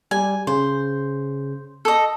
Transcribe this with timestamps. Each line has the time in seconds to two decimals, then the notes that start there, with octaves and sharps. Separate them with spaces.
0.11 G3 G4 G#5
0.47 C#3 C5
1.85 A4 D#5